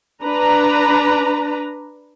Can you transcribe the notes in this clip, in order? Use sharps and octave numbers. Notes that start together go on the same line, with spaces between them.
D4 B4 A#5